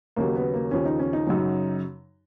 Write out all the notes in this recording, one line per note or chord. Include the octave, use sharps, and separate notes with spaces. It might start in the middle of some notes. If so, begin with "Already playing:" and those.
D#2 C#3 F#3 A#3
B3
A#3
D#2 C#3 F3 C#4
D#4
C#4
D#4
F#2 C#3 F#3